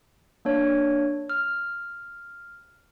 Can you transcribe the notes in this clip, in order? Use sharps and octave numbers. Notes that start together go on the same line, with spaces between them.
A#3 D4 C#5
F6